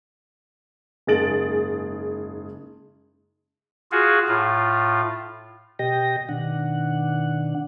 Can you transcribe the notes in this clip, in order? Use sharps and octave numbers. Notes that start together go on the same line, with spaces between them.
F#1 G#2 G#4 A6 D7 F#7
F4 F#4 G#4
A2 F4
B2 G4 D#5 G5 A#6
B2 D#3 D4 F#5